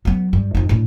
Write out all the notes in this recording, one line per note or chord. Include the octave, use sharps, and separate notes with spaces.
F#3 B3
G2
F2 D#4
A2 D4